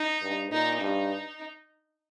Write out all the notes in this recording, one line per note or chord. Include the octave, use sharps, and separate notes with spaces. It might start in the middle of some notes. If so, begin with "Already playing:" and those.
Already playing: D#4
G2
A#2 D#4
G2 D#4